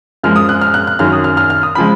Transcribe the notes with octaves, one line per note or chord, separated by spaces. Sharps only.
F#2 F3 G#3 F6
D#6
F#6
F6
F#6
F#6
F#2 D#3 F#3 F6
D#6
F6
F6
F6
D#6
C#3 F3 G#3 B5